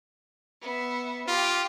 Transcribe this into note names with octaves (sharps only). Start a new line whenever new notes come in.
B3 E5
F4 G4 G5